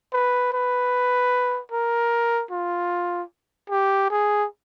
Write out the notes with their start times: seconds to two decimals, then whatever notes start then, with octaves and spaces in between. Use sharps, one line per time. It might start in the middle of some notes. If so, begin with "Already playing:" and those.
0.13 B4
0.53 B4
1.72 A#4
2.51 F4
3.70 G4
4.10 G#4